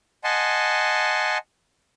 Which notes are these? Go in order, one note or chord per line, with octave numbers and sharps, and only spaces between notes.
D#5 F#5 G#5 A5 C6